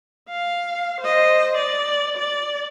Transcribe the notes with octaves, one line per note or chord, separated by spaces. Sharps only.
F5
C5 D#5
D5
D5